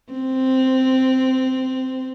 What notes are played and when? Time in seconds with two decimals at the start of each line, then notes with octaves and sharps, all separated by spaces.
0.13 C4